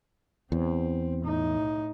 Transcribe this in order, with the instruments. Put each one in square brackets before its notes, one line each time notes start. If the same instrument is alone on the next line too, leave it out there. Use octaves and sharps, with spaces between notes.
[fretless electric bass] E2 [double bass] C4
[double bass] A2 D#4